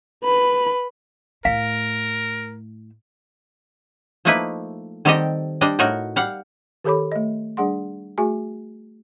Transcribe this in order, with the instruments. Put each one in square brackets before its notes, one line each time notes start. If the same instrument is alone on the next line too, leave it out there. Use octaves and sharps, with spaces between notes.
[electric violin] B4 B5
[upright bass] A2 A3 [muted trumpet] A#4 [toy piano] F5
[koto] F3 A3 A#3 D#4 E4 B4
D#3 G3 C4 G4 A4 D#5
G3 D4 D#5
A2 D#4 F#4 A#4
G3 F5 F#5
[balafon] D#3 G4 A4 C#5 B5 D6
A3 D#5
G3 D4 G#4 F#5 C6
A3 F#4 G#4 G#5